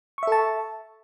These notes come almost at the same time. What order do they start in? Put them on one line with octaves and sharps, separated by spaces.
C#6 E5 A4 A5